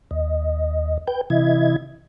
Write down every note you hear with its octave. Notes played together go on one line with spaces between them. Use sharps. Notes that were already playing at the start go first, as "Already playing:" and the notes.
D#2 D#5
B4 G5 G6
C3 E3 E4 D#5 E5 G#6